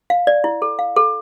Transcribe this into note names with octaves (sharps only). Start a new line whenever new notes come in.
F5
D5
E4
A4
F5
A4